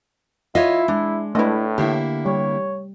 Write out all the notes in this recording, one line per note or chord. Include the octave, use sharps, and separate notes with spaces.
E4 F4 C#5 D#5 E5
G#3 D4
A2 A3 D4 E4 B4 D#5
D3 A#3 E4 G4
G3 C#5